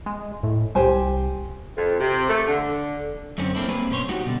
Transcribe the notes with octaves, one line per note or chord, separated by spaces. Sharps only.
G#3
A2
C2 G4 C5 G#5
F2
C3
A3
D3
F#2 D3 C4 C#4
A#3 C4 D4 E4
G3 A#3 C4 G#4 B4
G2 B2 C#4 C5 C#5
G3 D#4 F#4 G4
B2 D3